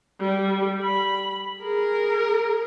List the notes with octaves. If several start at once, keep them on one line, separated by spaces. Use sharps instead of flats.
G3
B5
G#4 A#4